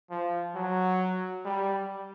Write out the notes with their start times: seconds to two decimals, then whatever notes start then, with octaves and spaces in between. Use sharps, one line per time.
0.11 F3
0.55 F#3
1.45 G3